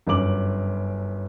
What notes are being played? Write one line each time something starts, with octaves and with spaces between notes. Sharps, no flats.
G1 F#2 C#4 A#4 D6 F#7